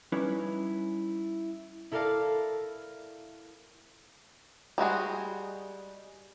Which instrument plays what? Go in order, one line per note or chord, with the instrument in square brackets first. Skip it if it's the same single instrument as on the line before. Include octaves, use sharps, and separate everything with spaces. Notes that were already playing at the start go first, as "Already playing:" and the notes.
[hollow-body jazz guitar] G3 C#4 D#4 E4 B4 C#5
[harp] E4 A4 A#4 D5 F5 A5
[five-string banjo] G3 G#3 F#4 G#4